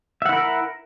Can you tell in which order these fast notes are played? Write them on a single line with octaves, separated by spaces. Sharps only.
E5 F#5 E4 A#4